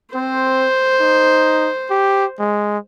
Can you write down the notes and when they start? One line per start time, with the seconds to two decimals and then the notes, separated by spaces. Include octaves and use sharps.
0.15 C4 C5
1.00 D#4
1.90 G4
2.39 G#3